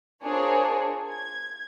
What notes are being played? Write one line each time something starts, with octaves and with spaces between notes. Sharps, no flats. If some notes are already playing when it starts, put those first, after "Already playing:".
D4 F4 G#4 A#4 C5 C#5
G#6